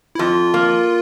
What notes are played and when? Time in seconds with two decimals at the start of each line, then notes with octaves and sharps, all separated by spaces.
0.15 E4
0.19 F2 F4
0.54 A#3